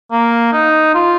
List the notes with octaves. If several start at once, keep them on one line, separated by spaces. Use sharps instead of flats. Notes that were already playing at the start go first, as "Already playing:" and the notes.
A#3
D#4
F4